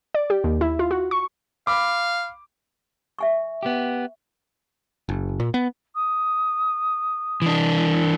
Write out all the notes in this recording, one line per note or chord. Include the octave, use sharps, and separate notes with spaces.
D5
G4
D#2
E4
F4
F#4
C#6
F5 B5 D6
E5 G#5 C#6
B3 G4
F#1
A#2
B3
D#6
E3 D4